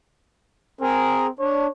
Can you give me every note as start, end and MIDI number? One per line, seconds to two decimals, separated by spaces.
0.81 1.30 60
0.81 1.27 68
0.81 1.27 70
1.39 1.67 62
1.39 1.70 73